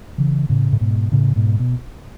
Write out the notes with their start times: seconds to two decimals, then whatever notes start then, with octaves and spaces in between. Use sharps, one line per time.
0.18 C#3 E3
0.50 A2 C#3
0.72 A2
0.80 G#2 B2
1.12 A2 C#3
1.36 G#2 B2
1.60 B2